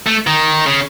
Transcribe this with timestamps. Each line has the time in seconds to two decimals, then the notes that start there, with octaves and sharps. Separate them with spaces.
0.07 A3
0.27 D#3
0.66 C#3